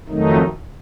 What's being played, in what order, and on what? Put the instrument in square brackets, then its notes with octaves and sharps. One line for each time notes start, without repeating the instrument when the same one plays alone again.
[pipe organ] F2 D#3 F#3 A3 D#4